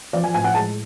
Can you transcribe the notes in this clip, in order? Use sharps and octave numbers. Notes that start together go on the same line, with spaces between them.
F3 D5
G#5
A2 G#5
F#5
G#3 A5